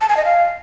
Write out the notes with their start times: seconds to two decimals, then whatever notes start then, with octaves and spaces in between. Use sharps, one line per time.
0.01 A5
0.09 G#5
0.17 D#5
0.25 F5